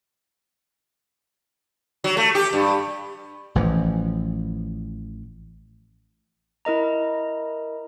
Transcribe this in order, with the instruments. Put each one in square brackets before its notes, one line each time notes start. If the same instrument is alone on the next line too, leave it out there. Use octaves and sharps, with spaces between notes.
[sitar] F#3
A3
G4
G2
[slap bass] A1 E3 F3
[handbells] E4 A#4 D#5 A#5